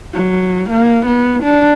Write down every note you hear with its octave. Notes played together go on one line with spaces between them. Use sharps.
F#3
A#3
B3
D4